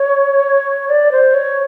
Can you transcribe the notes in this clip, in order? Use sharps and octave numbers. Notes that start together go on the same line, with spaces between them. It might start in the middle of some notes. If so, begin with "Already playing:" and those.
Already playing: C#5
D5
C5
C#5